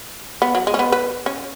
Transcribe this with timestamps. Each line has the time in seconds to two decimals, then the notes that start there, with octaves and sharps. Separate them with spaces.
0.42 B3
0.55 F#3
0.67 G#3
0.74 C#4
0.79 B3
0.92 B4
1.26 C#4